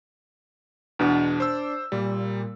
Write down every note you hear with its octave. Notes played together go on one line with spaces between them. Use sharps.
E2 B2 D4 F#5
C5 E6
A#2 G3